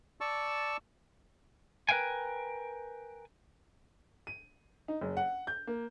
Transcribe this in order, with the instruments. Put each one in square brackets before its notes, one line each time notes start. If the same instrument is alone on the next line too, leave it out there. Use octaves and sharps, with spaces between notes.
[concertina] D5 A5 C#6 E6
[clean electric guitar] A#4 B4 F5 G5 G#5
[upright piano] D#7
D#4
F#1
F#5
G6
A#3